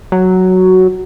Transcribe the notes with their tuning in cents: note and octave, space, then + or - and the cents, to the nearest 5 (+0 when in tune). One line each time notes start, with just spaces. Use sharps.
F#3 +5